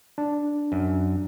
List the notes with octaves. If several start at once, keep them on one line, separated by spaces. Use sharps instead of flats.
D4
F#2